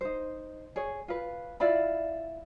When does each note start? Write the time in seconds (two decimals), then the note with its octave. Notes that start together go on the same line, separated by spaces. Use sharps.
0.01 D#4 C5
0.76 G#4 C#5
1.08 F4 B4
1.60 E4 F4 D5 B5